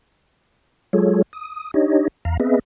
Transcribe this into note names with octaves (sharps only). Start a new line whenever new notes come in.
F#3 G#3 F4 G#4 A4 C#5
D#6
D4 D#4 G4 C#5 D#5
E2 F5 A#5
B3 C4 G#4 B4 D#5 E5